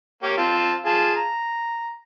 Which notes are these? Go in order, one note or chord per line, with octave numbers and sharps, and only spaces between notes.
A#3 G4 C#5
C4 F4 A5
F4 G#4 A5
A#5